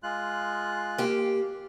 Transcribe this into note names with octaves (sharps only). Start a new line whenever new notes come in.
G#3 F4 F#6
A#3 G4